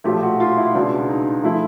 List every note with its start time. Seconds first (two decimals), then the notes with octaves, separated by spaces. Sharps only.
0.04 B1 A#2 F3 A3 G4
0.22 F#4
0.40 F4
0.57 E4
0.74 C#2 B2 G#3 D4
1.09 D#4
1.43 F3 A3 E4